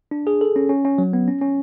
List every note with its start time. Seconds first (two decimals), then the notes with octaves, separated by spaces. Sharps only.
0.11 D4
0.27 G#4
0.41 A4
0.56 C#4
0.69 C#4
0.85 C#4
0.98 F#3
1.13 B3
1.28 C#4
1.42 C#4